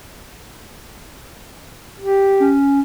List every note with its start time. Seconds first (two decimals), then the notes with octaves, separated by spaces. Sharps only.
2.00 G4
2.40 C#4